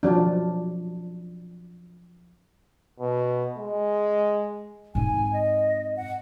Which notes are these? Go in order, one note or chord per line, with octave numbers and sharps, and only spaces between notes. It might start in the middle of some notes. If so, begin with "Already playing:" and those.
F3 F#3 D4
B2
G#3
G#2 C4 G#5
D#5
F#5